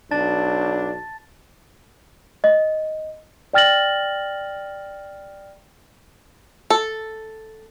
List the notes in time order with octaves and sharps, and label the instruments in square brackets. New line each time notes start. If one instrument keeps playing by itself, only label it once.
[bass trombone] B1 [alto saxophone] D4 [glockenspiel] A5 A6
[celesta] D#5
D5 G5 F6 A6 A#6 F#7
[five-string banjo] A4